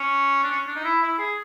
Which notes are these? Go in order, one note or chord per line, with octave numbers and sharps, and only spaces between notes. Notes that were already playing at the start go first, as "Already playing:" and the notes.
Already playing: C#4
D4
C#4
D4
D#4
E4
E4
G#4